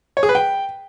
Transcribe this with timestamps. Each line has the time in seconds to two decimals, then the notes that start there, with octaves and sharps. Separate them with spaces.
0.17 C#5
0.23 G#4
0.29 B4
0.35 G5